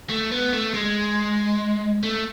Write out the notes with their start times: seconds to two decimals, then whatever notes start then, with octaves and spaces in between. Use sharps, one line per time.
0.09 A3
0.32 B3
0.53 A3
0.74 G#3
2.03 A3